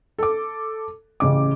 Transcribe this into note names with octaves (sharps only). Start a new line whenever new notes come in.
A4 D6
A1 C#3 D6